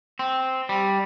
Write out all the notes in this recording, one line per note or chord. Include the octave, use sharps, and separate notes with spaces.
C4
G3